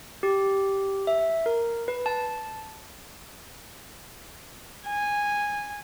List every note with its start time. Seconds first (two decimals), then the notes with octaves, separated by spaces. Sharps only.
0.23 G4
1.07 E5
1.46 A#4
1.88 B4
2.06 A5
4.87 G#5